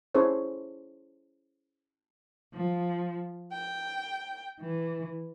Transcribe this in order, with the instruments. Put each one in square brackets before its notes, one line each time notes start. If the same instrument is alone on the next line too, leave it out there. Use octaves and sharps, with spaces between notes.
[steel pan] C#4 E4 G#4 A4 C5 C#5
[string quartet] F3
G5
E3